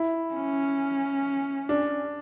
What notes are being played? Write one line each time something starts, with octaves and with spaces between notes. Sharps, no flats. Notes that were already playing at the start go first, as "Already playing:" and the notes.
Already playing: E4
C#4
D4